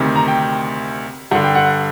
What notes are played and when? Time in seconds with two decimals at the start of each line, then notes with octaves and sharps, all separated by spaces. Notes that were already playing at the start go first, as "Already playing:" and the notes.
Already playing: D2 C3 D#3
0.16 A#5
0.28 G5
1.31 G2 D3 F#5
1.43 G5
1.55 F#5